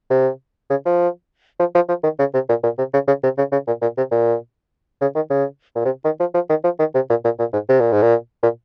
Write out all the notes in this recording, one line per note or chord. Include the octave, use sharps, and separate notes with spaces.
C3
C#3
F3
F3
F3
F3
D#3
C#3
C3
A#2
A#2
C3
C#3
C#3
C3
C#3
C#3
A#2
A#2
C3
A#2
C#3
D#3
C#3
A#2
C3
D#3
F3
F3
D#3
F3
D#3
C3
A#2
A#2
A#2
G#2
C3
A#2
G#2
A#2
A#2